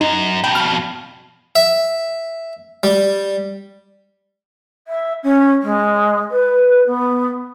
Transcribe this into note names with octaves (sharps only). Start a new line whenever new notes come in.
F#2 D#4
F2 B2 G5
F6
E5
G3
E5
C#4
G#3
B4
B3